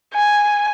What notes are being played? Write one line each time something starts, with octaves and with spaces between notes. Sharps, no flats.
G#5